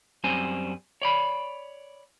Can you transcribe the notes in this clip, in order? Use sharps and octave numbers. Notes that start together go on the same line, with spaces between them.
F#2 G3 C4 C5 G#5
C#5 D5 B5